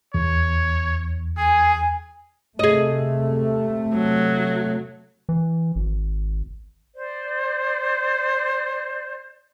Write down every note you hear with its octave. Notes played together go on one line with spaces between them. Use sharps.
E2 C#5
G#4 G#5
C3 A3 G#4 D#5
F#3
E3
G#1
C5 D5